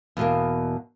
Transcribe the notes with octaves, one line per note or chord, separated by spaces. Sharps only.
E2 B2 A#3